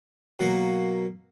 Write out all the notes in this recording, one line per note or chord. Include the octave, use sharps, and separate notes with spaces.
B2 F#3 A#3 F#5